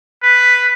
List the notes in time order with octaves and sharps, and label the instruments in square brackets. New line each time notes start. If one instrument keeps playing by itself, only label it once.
[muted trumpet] B4